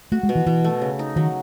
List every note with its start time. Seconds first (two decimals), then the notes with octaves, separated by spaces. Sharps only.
0.12 A3 F#4
0.23 G#3
0.29 B2
0.35 E3
0.46 B2 E3
0.64 A3
0.82 C#3
0.99 D#4
1.16 D#3 F#3